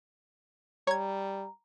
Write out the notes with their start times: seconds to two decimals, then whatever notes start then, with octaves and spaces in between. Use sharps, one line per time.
0.87 G3 C#5 A#5 G#6